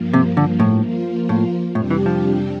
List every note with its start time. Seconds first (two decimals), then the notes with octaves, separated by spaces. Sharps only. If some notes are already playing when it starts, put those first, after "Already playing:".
Already playing: G2 F3 A#3
0.13 C3
0.37 D3
0.60 A2
0.83 F3 A#3 F4
1.29 A2
1.75 F2 A2 C3 G3 D4 G4
1.91 E3
2.06 F3